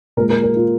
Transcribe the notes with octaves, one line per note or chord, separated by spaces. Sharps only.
A#2 G#3 A#4
A#4
A#4
F4